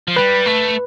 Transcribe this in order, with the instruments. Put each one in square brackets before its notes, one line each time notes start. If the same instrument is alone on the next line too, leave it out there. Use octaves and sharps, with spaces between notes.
[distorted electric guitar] F3
[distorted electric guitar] G3 [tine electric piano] B4
[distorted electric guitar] A3